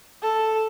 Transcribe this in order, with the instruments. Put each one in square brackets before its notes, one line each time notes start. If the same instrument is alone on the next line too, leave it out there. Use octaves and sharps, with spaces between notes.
[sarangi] A4